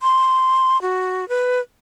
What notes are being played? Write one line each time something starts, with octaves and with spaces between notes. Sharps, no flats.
C6
F#4
B4